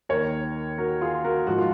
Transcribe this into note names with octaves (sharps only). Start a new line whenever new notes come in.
D#2 D#3 A#4 C#5
F#4 A#4
F4 G#4
F#4 A#4
G#2 F3 F#4
F4